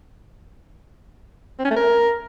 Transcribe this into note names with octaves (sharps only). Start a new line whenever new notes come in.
C4
C#4
A3
A#4